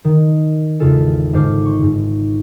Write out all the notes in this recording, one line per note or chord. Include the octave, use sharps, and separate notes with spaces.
D#3
G#1 E2 C#3 F4 A4 G#5
G#2 D3 C5 D6 F6
C6 C#6
G#2